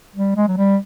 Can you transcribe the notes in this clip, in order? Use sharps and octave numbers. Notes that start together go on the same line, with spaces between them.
G3
G#3
F#3
G3